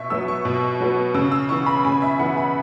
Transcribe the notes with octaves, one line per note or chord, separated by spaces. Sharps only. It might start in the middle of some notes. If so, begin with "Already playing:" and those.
Already playing: B2 E5 C#6
F#3 B3 E6
C#6
B2
F#3 B3
C#3 E6
E6
E3 B3 C#6
B5
C#3 G#5
E5
E3 B3 F#5
B5